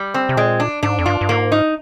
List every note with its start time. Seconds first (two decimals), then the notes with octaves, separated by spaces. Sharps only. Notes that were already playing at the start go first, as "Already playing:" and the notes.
Already playing: G3
0.14 C4
0.29 C3
0.37 A#2 G#3
0.60 D4
0.83 G#2 D4
0.99 F2
1.06 G2 F4
1.21 G2
1.29 G#2 A#3
1.52 D#4